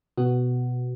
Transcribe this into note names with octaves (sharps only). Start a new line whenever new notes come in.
B2 B3 F#4